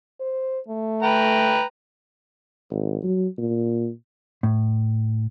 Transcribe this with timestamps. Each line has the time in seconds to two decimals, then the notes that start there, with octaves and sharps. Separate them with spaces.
0.20 C5
0.69 A3
1.03 B4 G5 A#5
2.71 G#1
3.03 F#3
3.38 A#2
4.43 A2